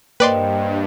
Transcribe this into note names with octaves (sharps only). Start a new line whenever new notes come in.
G2 A#3 B4 C5 D5 D#5 G5 C6